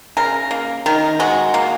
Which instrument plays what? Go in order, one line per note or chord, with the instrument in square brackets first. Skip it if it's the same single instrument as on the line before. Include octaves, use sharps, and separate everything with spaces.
[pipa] C#3 A#4
A#3
D#3 A#4
G#3 F#4
A#3